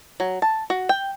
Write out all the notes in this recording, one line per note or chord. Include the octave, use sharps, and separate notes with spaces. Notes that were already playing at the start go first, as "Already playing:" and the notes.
F#3
A5
F#4
G5